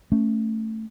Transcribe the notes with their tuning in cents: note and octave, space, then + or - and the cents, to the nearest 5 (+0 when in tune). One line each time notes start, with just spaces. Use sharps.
A3 +5 C#4 +0